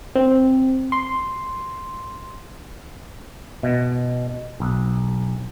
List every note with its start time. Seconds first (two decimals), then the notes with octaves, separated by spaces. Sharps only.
0.16 C4
0.92 C6
3.63 B2
4.60 B1